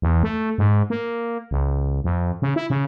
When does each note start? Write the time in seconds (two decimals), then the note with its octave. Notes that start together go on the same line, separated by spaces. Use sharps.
0.02 E2
0.23 A3
0.58 G#2
0.90 A#3
1.51 C#2
2.04 F2
2.42 C#3
2.56 E4
2.70 C#3